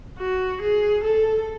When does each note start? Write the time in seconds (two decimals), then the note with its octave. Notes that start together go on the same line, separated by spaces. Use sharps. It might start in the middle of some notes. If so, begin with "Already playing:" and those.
0.18 F#4
0.62 G#4
1.03 A4